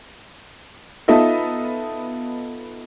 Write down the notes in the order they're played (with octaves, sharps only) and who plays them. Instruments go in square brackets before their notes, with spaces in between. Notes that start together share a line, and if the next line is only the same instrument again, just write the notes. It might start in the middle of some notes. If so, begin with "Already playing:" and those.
[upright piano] B3 D#4 F4 A4 D#5 E5